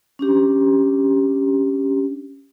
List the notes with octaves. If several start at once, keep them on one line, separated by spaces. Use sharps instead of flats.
C#4 D4 G4